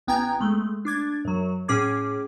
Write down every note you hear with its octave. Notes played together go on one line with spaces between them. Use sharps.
A1 B3 G5 G#5 A#5 G#6
G#3 A3
D4 D6 G#6 A6
F#2 F#3
A2 C#4 G#4 D6 G#6